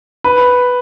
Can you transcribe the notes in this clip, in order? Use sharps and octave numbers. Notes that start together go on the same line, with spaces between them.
B4